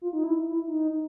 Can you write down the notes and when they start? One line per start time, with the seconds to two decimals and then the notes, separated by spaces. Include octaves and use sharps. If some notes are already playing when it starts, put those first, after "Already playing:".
0.01 F4
0.13 D#4
0.24 E4
0.46 E4
0.68 D#4